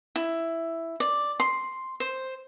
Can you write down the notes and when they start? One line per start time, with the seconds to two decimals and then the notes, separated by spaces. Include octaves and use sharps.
0.16 E4
1.00 D5
1.40 C6
2.00 C5